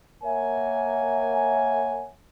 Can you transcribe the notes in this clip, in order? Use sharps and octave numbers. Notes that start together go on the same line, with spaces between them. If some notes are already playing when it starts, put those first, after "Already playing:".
A#3 A#4 C#5 E5 F#5 G#5